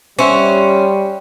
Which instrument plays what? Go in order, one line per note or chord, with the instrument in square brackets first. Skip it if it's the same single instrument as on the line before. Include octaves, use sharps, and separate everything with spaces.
[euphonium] G3 [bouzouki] C#4 [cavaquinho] C5 E5 F#5